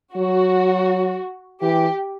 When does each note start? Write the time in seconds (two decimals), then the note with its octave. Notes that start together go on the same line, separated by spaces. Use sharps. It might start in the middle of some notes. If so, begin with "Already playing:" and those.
0.15 F#3 F#4
1.62 E3 G4